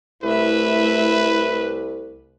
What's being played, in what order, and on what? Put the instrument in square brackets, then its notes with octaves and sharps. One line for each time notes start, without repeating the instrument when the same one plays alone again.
[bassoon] C2 [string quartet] A3 E5 [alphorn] E4 [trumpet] B4